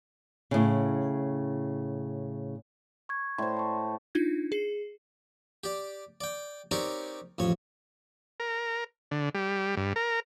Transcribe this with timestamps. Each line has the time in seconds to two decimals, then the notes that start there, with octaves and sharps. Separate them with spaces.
0.51 A2 C#3
3.09 C#6 G#6
3.38 A2 C5 D5 C6
3.57 A5 C#6
4.15 D4 D#4 F4 G#6
4.52 G#4 C7
5.64 G4 D5
6.21 D5 G5
6.71 C4 D#4 G4 A#4 C#5 D5
7.38 A1 F2 C#5
8.40 A#4
9.11 D3
9.35 G3
9.77 G2
9.96 A#4